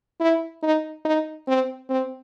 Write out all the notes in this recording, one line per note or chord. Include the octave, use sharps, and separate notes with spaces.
E4
D#4
D#4
C4
C4